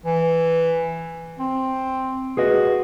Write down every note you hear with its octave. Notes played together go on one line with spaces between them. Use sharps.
E3
C4
F#4 G#4 B4 D#5